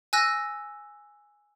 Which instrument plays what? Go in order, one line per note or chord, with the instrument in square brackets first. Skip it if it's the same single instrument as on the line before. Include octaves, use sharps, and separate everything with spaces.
[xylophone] G#5 E6 F#6 A#6